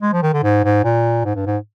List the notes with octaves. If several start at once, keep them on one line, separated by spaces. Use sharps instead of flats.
G#3
F3
D#3
D3
G#2
G#2
A#2
G#2
G2
G#2